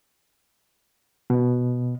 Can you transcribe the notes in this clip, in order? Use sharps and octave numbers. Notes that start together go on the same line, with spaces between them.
B2